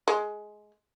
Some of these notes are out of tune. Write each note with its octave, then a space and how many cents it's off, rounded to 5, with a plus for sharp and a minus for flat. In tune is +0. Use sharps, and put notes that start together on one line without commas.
G#3 +15